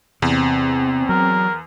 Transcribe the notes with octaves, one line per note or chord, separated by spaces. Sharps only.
E2 C3 C4
F#3 A#4